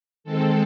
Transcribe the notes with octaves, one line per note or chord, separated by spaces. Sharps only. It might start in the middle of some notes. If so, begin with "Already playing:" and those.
D#3 G#3 C4 A4